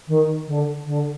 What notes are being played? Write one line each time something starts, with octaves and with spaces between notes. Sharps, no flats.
D#3
D3
D3